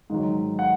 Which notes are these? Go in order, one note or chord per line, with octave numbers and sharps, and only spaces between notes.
G#2 D#3 F#3
F#5